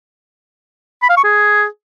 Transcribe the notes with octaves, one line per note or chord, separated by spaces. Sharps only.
B5
F5
C#6
G#4